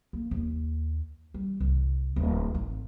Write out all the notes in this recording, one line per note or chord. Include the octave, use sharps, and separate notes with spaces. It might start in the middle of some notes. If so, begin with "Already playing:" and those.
A#3
D#2
G3
C2
D1
G#1